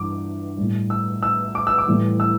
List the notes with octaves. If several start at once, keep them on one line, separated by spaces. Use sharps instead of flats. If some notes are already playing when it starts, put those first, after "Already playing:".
Already playing: G2 E3 D6
A2 G3
E6
E6
D6
E6
D6
A2 E3 G3
E6